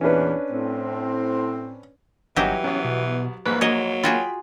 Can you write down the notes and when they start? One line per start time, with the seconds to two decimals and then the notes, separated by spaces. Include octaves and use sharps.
0.01 E2 A#2 E3 C#4 D4 B4
0.51 A2 C4
2.36 G1 E3 F#3 C#4 D#4 F#4 G4
2.64 C2 B3 C#4
2.85 B2
3.46 A#1 F2 G#2 A#3 B4
3.61 F#3 C#5 D#5
4.03 F4 F#4 G#4 G5 B5